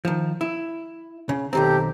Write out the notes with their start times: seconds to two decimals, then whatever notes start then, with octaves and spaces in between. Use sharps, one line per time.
0.05 D#3 F3
0.41 E4
1.29 C#3
1.53 B1 D#3 C4 G4 A4 A#5